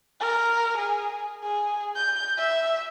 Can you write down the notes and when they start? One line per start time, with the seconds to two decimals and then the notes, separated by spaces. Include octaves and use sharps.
0.20 A#4
0.78 G#4
1.43 G#4
1.96 G6
2.38 E5